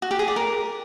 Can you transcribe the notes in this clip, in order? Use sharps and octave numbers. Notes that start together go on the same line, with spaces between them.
F#4
G4
G#4
D5
A#4